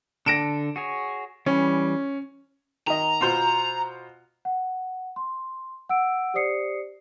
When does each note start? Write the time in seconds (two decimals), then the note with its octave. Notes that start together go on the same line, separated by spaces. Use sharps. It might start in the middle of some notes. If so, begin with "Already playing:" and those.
0.26 D3 D4 A4 A#6 D7 E7
0.76 F#4 G#4 C#5
1.46 E3 G3 C#4
2.87 D#3 D#5 A#5
3.21 B2 F4 C5
4.45 F#5
5.16 C6
5.89 F#5 E6 D7
6.34 G4 C5 D5 D#6 C7 C#7